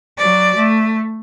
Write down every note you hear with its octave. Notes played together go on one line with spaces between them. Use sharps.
F#3 D5
A3